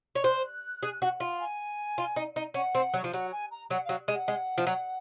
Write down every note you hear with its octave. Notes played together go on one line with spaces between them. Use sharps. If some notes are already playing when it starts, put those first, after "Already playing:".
C#5
C5 F#6
G#4
F#4
F4
G#5
F4
D#4
D#4
C#4 F#5
C4
F#3
F3
F#3 F#5
G#5
A#5
F#3 F#5
F#3 F5
G#3
F#5
G#3
F3
F#3